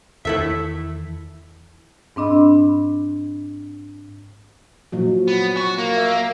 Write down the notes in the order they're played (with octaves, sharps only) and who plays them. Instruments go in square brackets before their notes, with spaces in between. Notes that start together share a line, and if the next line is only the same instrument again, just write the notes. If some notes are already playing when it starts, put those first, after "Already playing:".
[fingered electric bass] E2 D#3 E3 [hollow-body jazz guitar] E4 A4 E5
[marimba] G#2 C4 D4 D#5 B5 E6
[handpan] A#2 F3 F#3
[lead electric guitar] B3
F#4
A#3
[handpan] E5